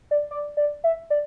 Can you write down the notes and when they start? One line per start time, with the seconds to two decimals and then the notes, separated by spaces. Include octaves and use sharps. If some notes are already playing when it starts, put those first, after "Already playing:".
0.11 D5
0.31 D5
0.57 D5
0.84 E5
1.10 D5